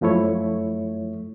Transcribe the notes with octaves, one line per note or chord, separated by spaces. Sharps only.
F#2 F3 A3 E4 C#5